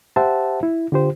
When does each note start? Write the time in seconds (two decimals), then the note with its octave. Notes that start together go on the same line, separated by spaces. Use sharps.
0.16 G4 C5 E5 F#5 A5
0.63 E4
0.92 D3 F4 G4 C5